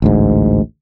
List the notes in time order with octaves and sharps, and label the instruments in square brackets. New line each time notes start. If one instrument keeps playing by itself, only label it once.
[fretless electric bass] A1 D2 G#2